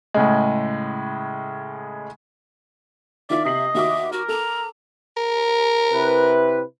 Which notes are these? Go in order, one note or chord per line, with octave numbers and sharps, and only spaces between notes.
A2 C#3 G#3
D#3 F4 D5 E5
C3 D#5 C7 F#7
D#2 F#4 E5 D6
F#4 A#4
A4 A#5
A#4
C3 E4 B4